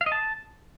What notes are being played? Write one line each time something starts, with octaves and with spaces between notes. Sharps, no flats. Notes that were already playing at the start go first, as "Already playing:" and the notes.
F5
D#5
A5